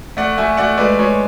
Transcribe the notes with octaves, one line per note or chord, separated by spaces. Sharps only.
A3 D5 F#5
A3 E5 G#5
A3 D5 F#5
G#3 B4 D5
G#3 C#5